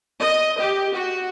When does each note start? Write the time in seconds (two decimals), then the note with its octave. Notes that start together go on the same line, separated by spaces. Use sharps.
0.18 D#5
0.59 G4
0.94 F#4